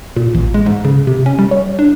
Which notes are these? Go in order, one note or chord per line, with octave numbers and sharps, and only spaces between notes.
A#2
A1
G#3
G#2
C#3
C3
C#4
G3
C#5
D4